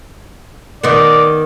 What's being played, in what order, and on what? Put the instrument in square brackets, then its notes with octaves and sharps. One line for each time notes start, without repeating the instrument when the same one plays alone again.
[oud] D#3 B3 [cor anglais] D5